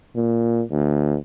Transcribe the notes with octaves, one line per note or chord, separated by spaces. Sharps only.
A#2
D2